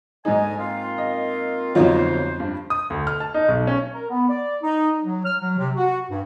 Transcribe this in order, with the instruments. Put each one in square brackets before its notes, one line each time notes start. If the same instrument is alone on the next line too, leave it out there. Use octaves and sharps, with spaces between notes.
[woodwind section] D2 D#5 G#5 [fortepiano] G#2 D#4
[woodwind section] A#3 C4 F4
[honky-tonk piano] D#5
[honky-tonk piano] G1 F#3 C#5 [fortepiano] F2 D#4 F4 [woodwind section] C5
[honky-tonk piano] G2
[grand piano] D#6
D2
F6
A5
D#4
B1
C#4
[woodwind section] A#4
B3
D5
D#4
F#3
F6
F#3
C3
F#4
G2